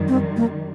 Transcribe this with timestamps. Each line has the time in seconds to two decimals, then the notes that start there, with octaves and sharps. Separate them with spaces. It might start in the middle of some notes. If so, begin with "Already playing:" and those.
Already playing: F#2 D#3 G3
0.09 C4
0.37 A#3